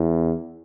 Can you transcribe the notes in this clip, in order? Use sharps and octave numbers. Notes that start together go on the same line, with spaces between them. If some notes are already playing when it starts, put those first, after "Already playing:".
Already playing: E2